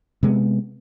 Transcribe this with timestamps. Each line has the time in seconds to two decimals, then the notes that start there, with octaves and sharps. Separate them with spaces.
0.23 C3 G#3 A3 B3